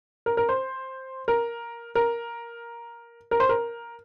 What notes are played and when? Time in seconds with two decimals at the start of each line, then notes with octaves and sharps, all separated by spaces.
0.26 A#4
0.37 A#4
0.49 C5
1.28 A#4
1.95 A#4
3.31 A#4
3.40 C5
3.49 A#4